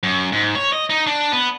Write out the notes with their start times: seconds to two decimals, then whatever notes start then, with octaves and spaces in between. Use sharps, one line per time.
0.03 F#2
0.32 G#2
0.55 C#5
0.73 D#5
0.90 D#4
1.07 D4
1.32 B3